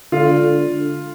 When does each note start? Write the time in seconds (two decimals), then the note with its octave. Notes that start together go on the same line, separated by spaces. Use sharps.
0.12 D3 F4